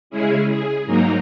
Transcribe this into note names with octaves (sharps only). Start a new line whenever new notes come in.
C#3 G#3 C#4 E4 G#4
G#4
G#2 F#3 A#3 D#4 A#4